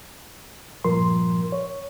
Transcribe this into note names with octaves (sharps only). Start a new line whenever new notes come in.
G2 A#2 F3 A#4 C6
C#5